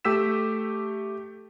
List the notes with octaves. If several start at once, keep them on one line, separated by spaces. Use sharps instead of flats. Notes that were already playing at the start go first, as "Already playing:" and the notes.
A3 G4 E6 B6 E7